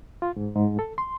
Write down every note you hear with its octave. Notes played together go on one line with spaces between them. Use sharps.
F4
G#2
G#2
A4
C6